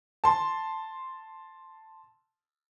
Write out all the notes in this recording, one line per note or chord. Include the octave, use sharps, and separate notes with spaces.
A5 C6